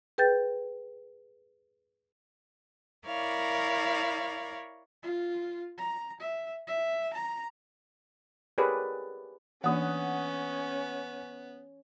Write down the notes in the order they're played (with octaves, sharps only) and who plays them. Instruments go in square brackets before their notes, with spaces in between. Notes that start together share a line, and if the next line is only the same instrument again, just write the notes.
[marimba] G#4 B4 G5 G6 A6
[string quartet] E4 A#4 C#5 D5 F5
[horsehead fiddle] F4
A#5
E5
E5
A#5
[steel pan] G4 G#4 A#4 B4 C#5 D5
[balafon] E3 A#3 D4 [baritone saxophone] B3 [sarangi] C#4 [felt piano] F#5 D#6